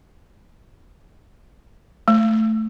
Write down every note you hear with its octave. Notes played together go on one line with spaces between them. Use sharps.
A3